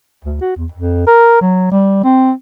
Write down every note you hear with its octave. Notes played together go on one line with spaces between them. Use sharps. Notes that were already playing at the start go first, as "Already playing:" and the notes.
D2
F#4
E2
F2
A#4
F#3
G3
C4